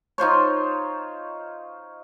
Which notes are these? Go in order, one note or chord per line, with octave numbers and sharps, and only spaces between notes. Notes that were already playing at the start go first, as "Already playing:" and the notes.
D#4 F4 C5 C#5